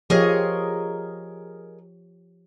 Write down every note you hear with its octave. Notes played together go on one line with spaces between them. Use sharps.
F3 G4 G#4 A#4 C#5 D#5